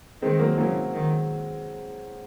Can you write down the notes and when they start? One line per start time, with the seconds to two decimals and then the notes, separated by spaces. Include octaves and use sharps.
0.22 D#3 G#3 C4
0.39 F#3 A#3
0.58 C#3 F#3 A#3
0.94 D#3